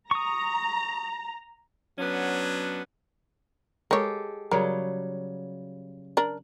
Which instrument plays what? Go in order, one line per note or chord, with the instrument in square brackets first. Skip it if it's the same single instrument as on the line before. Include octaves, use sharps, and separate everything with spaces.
[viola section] A#5 [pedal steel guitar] C#6 D#6
[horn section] F#3 B3 C#4 D4
[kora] G#3 G4 A4 [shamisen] A#4 C#5
[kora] C#3 F#3 G3 [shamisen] A#4
[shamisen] D4 A#4